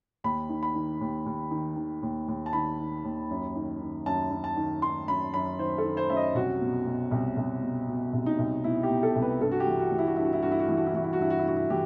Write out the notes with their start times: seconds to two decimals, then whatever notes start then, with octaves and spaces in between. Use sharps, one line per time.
0.24 D#2 B5
0.49 D#3
0.63 B5
0.75 D#3
1.01 D#2
1.26 D#2
1.51 D#3
1.76 D#3
2.02 D#2
2.28 D#2
2.46 A5
2.53 D#3 B5
2.79 D#3
3.04 D#2
3.30 F#2
3.55 D#3
3.81 D#3
4.06 F#2 A5
4.31 F#2
4.44 A5
4.57 D#3
4.82 D#3 C6
5.08 F#2 B5
5.34 F#2 B5
5.59 D#3 C5
5.78 A4
5.84 D#3
5.97 C5
6.10 F#2 E5
6.16 D#5
6.35 C2 F#4
6.61 B2
6.86 B2
7.11 C2
7.37 C2
7.63 B2
7.88 B2
8.13 C2
8.26 D#4
8.39 C2
8.64 B2 E4
8.83 G4
8.90 B2
9.03 A4
9.16 C2
9.22 B4
9.41 G2 A4
9.51 F#4
9.60 G4
9.66 E3
9.79 F#4
9.91 E3
9.98 E4
10.07 F#4
10.16 G2 E4
10.25 F#4
10.33 E4
10.42 G2 F#4
10.51 E4
10.59 F#4
10.68 E3 E4
10.77 F#4
10.86 E4
10.94 E3 F#4
11.04 E4
11.13 F#4
11.19 G2 E4
11.30 F#4
11.39 E4
11.45 G2 F#4
11.56 E4
11.70 E3 G4